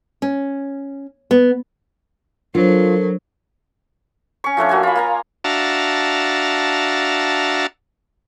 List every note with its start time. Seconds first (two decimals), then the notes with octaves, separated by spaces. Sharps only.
0.22 C#4
1.31 B3
2.55 F#3 D4 F4 A4 A#4 C5
4.44 C#4 C#6
4.57 F3 A3 D4 C#5
4.69 A#3 F#4 D#5 G#5
4.83 F4 B5
4.95 A#3 F5 A#5
5.44 D4 F#4 E5 F5 A5 A#5